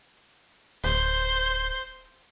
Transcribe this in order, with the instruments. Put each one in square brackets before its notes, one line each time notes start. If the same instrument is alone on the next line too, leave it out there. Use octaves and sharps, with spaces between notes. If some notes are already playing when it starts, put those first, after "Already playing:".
[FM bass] D1 [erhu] C5